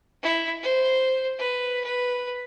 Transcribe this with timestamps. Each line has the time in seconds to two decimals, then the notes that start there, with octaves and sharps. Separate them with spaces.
0.23 E4
0.63 C5
1.39 B4
1.84 B4